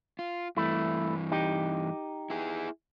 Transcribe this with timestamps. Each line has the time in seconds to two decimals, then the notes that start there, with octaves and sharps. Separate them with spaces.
0.19 F4
0.57 G2 E3 A3 E4
1.32 D#4 G4
2.30 E4 G#4